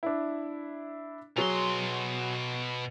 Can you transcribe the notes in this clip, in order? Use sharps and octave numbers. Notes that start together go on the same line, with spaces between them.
D4 E4
B2 F#3 G#4 C6 F7